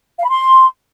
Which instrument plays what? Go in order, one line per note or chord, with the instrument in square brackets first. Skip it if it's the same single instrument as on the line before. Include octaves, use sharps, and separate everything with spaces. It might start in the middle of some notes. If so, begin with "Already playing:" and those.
[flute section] F5
B5
C6